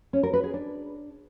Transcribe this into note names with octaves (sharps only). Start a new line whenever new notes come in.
C#4
A#4
B4
G#4
D4